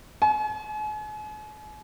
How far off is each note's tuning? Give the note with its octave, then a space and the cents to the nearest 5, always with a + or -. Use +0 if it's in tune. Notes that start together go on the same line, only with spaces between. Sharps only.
G#5 +40